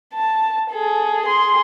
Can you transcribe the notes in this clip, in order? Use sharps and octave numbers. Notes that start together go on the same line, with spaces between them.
A5
G#4 A4
G#4 C6